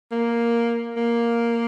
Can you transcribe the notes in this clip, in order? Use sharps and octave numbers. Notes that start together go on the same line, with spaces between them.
A#3
A#3